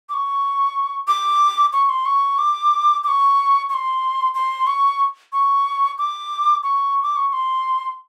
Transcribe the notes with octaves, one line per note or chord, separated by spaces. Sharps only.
D6
C#6
D6
C#6
C6
C#6
D6
D6
C#6
C#6
C6
C6
C#6
C#6
D6
C#6
D6
C#6
C#6
C6